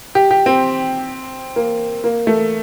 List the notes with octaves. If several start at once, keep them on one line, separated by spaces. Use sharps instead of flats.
G4
G4
C4
A#3
A#3
A3